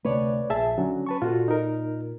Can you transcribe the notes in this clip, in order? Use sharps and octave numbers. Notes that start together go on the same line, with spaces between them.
D2 C3 A3 B4 C#5 D5
A#1 G#4 E5 A5
D3 F#3 C#4
B4 A5 C#6
A#2 F4 F#4 A4
D#4 A#4